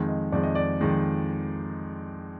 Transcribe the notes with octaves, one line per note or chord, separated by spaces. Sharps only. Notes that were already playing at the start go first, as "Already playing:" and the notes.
Already playing: F2 D#3 G#3
D#5
F2 D#3 G#3 D5
D#5
D5
F2 D#3 G#3